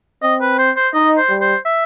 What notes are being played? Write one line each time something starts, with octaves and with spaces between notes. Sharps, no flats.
C4 D#5
B4
C5
C5
D#4 D#5
C5
G3
C5
E5